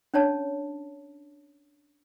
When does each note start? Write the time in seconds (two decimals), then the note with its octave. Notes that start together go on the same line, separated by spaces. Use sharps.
0.14 C#4 D4 C#5 A5